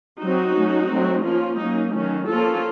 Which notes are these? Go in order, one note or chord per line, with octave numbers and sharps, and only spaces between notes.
F#3 C4 D#4 F#4
F#3 A3 C#4
F#3 A3 C4
F3 A#3 C#4 F4
F#3 A#3 C#4 D#4
D#3 F#3 A3 C#4
F3 A#3 C#4 F4 A4